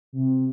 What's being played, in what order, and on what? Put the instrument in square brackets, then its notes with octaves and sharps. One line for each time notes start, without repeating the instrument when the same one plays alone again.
[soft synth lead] C3